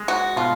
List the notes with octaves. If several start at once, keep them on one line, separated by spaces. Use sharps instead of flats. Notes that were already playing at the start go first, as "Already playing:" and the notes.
Already playing: G#3
F#4
B2 F4